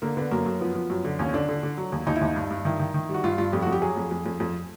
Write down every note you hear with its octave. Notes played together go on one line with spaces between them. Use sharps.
D3 A#3
D3 B3
F#2 A#3
F#2
F3 B3
F3
F#2
D3
D#2 C#4
D3 D4
D3
D3
F#3
D#2
D#2 D#4
E4
D#2 D#4
G2
G2
D#3 E4
D#3
D#3
G3 F#4
G2 F4
G2 F4
F2 G4
F#4
F2
G4
F#3 G#4
F2
F2
F2
F2